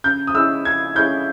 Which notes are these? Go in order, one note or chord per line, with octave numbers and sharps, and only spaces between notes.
C#3 G6
D#6
G#3 C#4 E4 E6
C#3 G#6
G#3 C#4 E4 G6